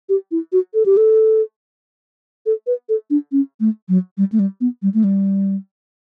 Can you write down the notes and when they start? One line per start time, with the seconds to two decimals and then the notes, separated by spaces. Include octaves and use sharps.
0.09 G4
0.31 E4
0.52 F#4
0.74 A4
0.86 G4
0.97 A4
2.46 A4
2.67 B4
2.89 A4
3.10 D4
3.32 C#4
3.60 A3
3.89 F#3
4.18 G3
4.32 A3
4.39 G3
4.61 B3
4.82 G3
4.94 A3
5.04 G3